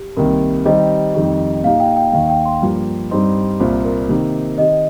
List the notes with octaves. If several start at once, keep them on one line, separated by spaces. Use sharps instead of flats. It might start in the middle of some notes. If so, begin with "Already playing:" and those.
Already playing: G4
C2 C3 D#3 A#3 A#4
D#3 G3 C4 D#4 G4 D#5
F2 D#3 G3 D#4 G4
A#2 A#3 D#4 G4 F5
G5
G5
D#2 D#3 A#3 F5
G5
C6
G2 F3 A#3 G4
G2 G3 C4 D#4 C6
C2 A#2 A#3 F4 C5
A#4
C3 D#3 A#3 D#4
D#3 C4 G4 D#5